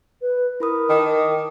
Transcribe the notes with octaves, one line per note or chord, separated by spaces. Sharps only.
B4
E4 A#4 B5 D#6
D#3 A5 D6 D#6